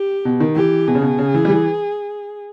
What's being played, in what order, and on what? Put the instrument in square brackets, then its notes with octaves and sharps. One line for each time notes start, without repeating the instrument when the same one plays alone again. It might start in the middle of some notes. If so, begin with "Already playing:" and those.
Already playing: [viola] G4
[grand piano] B2
D#3
[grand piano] E3 [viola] G4
[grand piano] B2 [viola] G#4
[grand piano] C#3
B2
C#3
E3
G3
E3